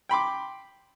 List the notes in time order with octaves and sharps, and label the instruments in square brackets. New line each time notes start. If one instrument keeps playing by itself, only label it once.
[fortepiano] G5 B5 C6 D6